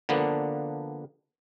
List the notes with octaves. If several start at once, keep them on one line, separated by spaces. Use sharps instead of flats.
D3 F3 A#3 B3 D4